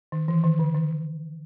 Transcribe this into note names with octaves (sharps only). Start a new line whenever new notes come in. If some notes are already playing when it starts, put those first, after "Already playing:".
D#3
E3
D#3
D3
D#3